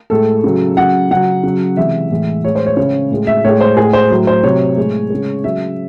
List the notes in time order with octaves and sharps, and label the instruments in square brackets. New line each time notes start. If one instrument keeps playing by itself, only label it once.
[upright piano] A2 G#3 A4
C#3 F#3
C#3 F#3 F#5
C#3 F#3 F#5
C#3 F#3
C3 E3 G#3 E5
A2 E3 G#3
A2 G#3 C#5
C5
C#5
C#3 G#3 C#5
A2 G#3
E5
A2 G#3 C#5
C5
A2 G#3 G#4
C5
A2 F#3
C5
C3 F#3 C#5
A2 G#3
C#3 G#3
C#3 F#3 E5